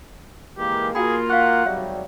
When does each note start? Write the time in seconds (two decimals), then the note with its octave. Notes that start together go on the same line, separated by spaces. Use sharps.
0.59 E3 G#3 A#3 G4
0.95 A#3 F4 F#4 G#4 G5 B5
1.30 F5 F#5 C#6
1.66 G#1 F#3 G3 C#5 E5